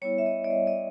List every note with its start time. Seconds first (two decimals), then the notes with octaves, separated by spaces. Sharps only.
0.02 G3 B3 E4 C#5
0.18 E5
0.26 D#5
0.44 D5
0.50 G3 B3 E4 D#5
0.67 D#5